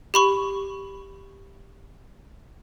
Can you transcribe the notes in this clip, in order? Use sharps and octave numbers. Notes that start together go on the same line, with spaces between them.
G4 B5 C#6